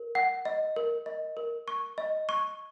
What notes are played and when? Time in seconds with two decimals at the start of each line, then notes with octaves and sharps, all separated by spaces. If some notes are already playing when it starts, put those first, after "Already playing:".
Already playing: A#4
0.15 F#5
0.45 D#5
0.76 A#4
1.06 D#5
1.37 A#4
1.68 C#6
1.98 D#5
2.29 C#6